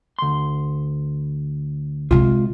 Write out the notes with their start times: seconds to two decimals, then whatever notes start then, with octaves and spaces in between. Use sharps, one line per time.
0.19 D2 C6
2.11 C3 G#3 F4